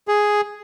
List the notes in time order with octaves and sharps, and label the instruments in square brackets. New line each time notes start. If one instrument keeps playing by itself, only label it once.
[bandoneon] G#4